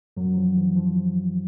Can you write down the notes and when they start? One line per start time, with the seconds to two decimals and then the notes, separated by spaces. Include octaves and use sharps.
0.17 F#2 F#3
0.37 F3
0.57 E3
0.77 F3